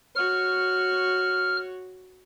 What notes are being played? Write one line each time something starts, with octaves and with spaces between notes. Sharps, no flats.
F#4 C#5 F6